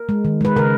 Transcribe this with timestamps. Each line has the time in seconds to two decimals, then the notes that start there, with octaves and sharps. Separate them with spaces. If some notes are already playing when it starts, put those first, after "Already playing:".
Already playing: A#4
0.09 G#3
0.25 D#3
0.41 G#3 B4
0.56 C#3 A#4